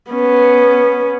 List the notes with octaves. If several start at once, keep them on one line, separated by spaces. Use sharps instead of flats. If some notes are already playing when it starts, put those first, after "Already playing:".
B3 C#4